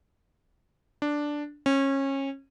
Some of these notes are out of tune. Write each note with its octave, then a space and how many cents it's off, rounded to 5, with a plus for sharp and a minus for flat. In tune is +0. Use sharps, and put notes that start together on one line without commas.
D4 +0
C#4 -25